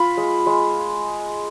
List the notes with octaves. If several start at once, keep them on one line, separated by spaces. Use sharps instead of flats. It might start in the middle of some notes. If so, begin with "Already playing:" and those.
Already playing: F4 B5
G#3
G#3